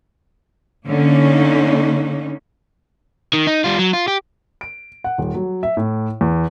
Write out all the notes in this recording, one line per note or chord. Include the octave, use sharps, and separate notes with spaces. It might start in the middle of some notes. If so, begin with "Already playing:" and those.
D3 A#3 C#4 D#4
D#3
D#4
G3 F4
F#3
F4
G4
D7
F#5
D#1
F#3
E5
A2
E2